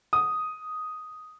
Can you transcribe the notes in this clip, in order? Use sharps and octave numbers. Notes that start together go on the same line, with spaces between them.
D#6